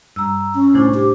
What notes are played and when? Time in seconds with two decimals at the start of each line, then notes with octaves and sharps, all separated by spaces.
0.16 G2 A#5 E6
0.54 C#4
0.74 C2 A2 D4 C5
0.94 G4